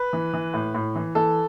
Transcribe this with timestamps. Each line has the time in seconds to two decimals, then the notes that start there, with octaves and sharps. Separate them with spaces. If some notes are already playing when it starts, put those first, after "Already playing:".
Already playing: B4
0.13 E3
0.33 E3
0.54 A2
0.75 A2
0.95 E3
1.15 E3 A4